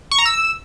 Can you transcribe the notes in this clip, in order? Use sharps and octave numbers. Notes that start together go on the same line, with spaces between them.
C#6
A#5
E6